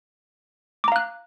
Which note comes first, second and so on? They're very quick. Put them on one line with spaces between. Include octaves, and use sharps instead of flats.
D6 A#5 F5 F#6